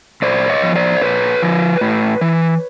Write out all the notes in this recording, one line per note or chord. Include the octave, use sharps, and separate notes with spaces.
A#2 C5 D5
C#5 D#5
F3
C5 D5
A#2 B4 C#5
F3
A2
E3